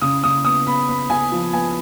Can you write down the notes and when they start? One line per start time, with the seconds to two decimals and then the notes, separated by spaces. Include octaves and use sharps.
0.02 C#3 D#6
0.24 C#3 D#6
0.45 B3 D#6
0.67 B3 B5
0.88 B3 B5
1.10 B3 G#5
1.32 F3
1.53 B3 G#5